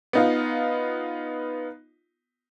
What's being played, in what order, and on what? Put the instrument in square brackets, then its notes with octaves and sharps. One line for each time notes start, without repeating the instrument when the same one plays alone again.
[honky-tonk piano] B3 D#4 F4